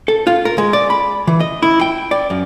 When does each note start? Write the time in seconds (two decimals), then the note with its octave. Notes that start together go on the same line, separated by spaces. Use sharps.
0.08 A4
0.27 F4
0.45 A#4
0.58 G#3
0.73 D5
0.90 B5
1.27 E3
1.40 D#5
1.62 E4
1.81 G5
2.11 D5
2.30 F#2